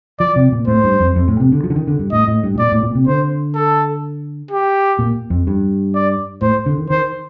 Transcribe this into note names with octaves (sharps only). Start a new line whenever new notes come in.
F3 D5
C3
A#2
A2 C5
G2
F2
F2
A2
C3
D3
F3
D3
D#3
D3
G2
A2 D#5
A2
G2
A2
A#2 D5
A2
A#2
C3
D3 C5
A4
G4
A#2
F2
G2
D5
A2 C5
D3
D#3
D#3 C5